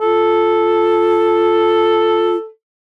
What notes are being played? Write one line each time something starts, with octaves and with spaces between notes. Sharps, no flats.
F4 A4